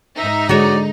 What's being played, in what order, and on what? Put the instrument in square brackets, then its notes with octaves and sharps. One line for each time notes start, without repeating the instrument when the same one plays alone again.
[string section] G#2 D#4 [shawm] E5
[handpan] D3 G#3 G#4 [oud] F#4 C#5 [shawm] D5